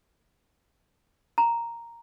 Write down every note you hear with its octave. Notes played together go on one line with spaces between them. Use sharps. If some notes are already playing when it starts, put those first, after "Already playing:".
A#5